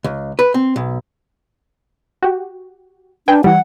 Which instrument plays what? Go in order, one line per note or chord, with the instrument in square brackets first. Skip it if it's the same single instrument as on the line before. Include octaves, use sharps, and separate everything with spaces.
[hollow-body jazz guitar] C#2
B4
C4
B1
[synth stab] F#4 G4
[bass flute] D4 [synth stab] B4 G5 G#5
[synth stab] E3 G3 [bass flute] F#5